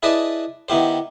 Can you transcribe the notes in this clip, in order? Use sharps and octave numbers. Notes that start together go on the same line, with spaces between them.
E4 G#4 B4 D5 D#5 A5
D#3 B3 E4 G4 C5